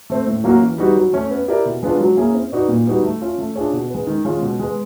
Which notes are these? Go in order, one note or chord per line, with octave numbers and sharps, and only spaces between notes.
A3 C4
A2
F#3 A#3 C#4 F#4
E3
G3 B3 D#4 F#4
F#3
A3 C#4
B3
E4 G4 A#4 D5
B2
G#3 B3 D4 F4
F#3
A#3 C#4 E4 G#4
C4
D#4 F#4 B4 D5
A#2
G3 B3 D#4 F#4
A3
C#4 F4
A3
D4 F4 G#4 C#5
B2
G#3 B3
D#3
G#3 C#4 F4
B2
G#3 B3